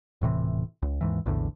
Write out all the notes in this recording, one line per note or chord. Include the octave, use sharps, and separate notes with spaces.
D#1 A2 C3 E3
C#2
D#2 G#2 E3
A#1 E2 A2 D3